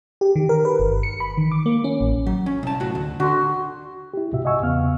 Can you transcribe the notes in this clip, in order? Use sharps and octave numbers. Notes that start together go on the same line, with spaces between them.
G4
D#3
A#4
B4
G1
C#7
B5
D#3
D6
A#3
C#4
A1
F#3
C#4
C2 A5
A2 F#4
D2
D3 F#4 C6
E4 G4
C2 G#2 C3 F#4 E5
D#5 E5 F#5 G#5 C#6 E6
E2 C#3 B3 F5 F6